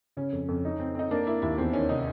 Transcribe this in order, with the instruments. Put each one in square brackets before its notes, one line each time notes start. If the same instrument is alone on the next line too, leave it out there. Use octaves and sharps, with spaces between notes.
[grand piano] C#3 [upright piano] C#4
[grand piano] F2
F2
D#4
C4
[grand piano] C4 [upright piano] D#4
[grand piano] A#3 [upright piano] D4
[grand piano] A#3 [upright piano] E4
[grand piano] D#2 [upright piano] E4
[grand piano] E2 [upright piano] C4
[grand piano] D#3 [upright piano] C#4
[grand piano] C3 [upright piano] D#4